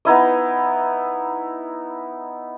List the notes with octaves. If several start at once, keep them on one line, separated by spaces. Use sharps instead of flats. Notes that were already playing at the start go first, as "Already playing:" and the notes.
B3 D#4 E4 D#5